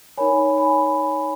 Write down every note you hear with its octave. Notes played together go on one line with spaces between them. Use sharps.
D#4 A#4 C#5 G#5 B5
G#5 B5